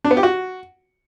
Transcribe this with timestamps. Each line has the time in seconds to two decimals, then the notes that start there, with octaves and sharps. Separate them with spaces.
0.05 D4
0.11 B3
0.17 G4
0.23 F#4